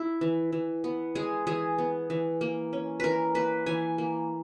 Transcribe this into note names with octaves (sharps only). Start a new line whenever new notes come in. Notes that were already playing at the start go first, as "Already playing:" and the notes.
Already playing: E4
E3
E3
B3
G#3 G#4
E3 G#4
B3
E3
A#3
C#4
E3 A#4 B4
A#3 B4
E3 G#5
A#3